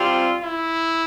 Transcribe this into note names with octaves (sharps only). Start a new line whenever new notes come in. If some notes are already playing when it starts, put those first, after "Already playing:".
Already playing: C3 G3 C4 F4
E4